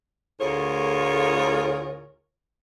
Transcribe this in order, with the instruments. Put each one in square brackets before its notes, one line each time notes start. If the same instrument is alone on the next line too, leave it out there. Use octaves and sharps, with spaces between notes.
[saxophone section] D2 A2 F4 G#4 A#4 C#5